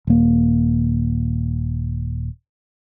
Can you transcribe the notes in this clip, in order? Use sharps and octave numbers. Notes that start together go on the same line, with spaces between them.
D#1 A#3